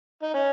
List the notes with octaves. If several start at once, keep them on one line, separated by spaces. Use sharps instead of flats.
D#4
C#4